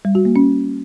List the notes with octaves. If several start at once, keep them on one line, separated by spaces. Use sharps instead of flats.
G3
F#4
A#3
C#4